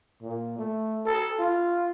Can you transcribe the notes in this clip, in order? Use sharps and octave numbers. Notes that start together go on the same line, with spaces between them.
A#2
A3
A4
F4